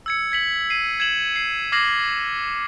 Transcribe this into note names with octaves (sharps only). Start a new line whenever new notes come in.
E6 G#6 C#7
G#6 B6 F#7
C7 D#7
G#6 E7 F#7
C7
D6 F6 G#6 A#6 C7 F#7